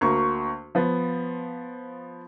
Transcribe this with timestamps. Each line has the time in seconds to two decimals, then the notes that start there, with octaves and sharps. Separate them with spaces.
0.01 D2 A#3 C#6
0.75 F3 B3